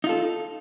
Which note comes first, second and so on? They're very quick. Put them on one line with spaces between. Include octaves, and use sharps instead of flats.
D#4 F4 A4